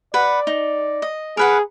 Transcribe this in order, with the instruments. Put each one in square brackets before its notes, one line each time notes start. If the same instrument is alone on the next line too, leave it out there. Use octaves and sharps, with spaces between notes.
[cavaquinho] B4 F#5 [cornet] D5
[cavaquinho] D#4
D#5
[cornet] G#4 [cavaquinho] A#4 B4 F#5